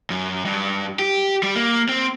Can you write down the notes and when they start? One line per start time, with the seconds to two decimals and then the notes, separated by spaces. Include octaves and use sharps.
0.10 F#2
0.45 G2
0.99 G4
1.43 G3
1.55 A#3
1.89 C4